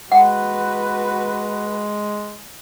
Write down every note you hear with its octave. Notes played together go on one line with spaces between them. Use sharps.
G#3 F#4 B4 F#5